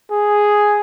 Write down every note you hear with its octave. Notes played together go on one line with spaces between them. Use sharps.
G#4